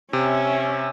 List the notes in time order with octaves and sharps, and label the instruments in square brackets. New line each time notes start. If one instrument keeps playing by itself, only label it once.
[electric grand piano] C3 [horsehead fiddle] C#4 E5